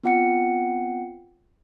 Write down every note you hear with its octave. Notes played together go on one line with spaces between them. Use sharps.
B3 C4 F4 F#5 G5 C#7